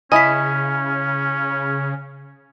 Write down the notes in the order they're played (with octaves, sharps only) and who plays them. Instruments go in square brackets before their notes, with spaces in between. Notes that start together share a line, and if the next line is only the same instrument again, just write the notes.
[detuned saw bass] C#3 [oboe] C#4 [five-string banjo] E4 D#5 [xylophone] G#5 B6